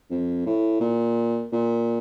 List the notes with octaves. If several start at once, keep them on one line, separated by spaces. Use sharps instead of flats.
F2
A2
A#2
A#2